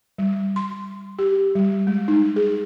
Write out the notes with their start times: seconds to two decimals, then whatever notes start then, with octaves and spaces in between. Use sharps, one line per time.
0.18 G3
0.56 C6
1.19 G4
1.55 G3
1.87 G#3
2.08 D#4
2.36 G#4